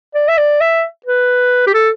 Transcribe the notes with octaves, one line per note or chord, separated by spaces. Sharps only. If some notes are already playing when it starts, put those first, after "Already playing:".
D5
E5
D5
E5
B4
G4
A4